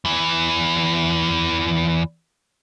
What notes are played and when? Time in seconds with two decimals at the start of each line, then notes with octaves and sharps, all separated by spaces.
0.05 E2 E3